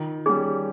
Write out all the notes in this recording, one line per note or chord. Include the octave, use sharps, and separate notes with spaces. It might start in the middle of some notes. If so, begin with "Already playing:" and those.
Already playing: D#3 F4
G3 C#4 G#4